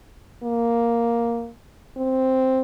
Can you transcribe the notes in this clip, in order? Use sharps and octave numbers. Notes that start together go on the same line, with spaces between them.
A#3
C4